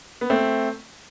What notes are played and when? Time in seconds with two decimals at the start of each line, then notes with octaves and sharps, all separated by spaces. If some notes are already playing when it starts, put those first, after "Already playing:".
0.21 B3
0.30 A3 C4